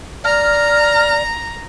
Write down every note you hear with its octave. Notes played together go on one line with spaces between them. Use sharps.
D5 A#5 F6